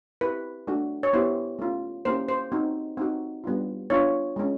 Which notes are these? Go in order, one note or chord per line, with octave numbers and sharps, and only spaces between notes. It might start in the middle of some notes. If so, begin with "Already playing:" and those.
C4 E4 G4 B4
A3 D4 F#4
C#5
B3 E4 G4 C5
A3 C#4 F4
A#3 C#4 E4 G4 C5
C5
C4 D#4 F#4
C4 D#4 F#4
G3 B3 D4 F4
B3 D4 F4 C#5
G#3 C#4 F4